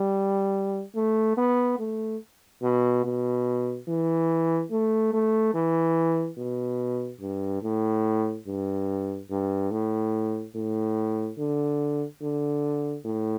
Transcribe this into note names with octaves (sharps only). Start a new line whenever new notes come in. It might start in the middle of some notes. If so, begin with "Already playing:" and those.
Already playing: G3
A3
B3
A3
B2
B2
E3
A3
A3
E3
B2
G2
A2
G2
G2
A2
A2
D3
D3
A2